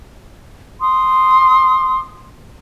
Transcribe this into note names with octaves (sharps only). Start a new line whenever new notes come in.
C6 D#6